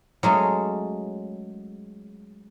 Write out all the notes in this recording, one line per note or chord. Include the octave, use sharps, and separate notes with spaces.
F#3 G#3 A3 C#4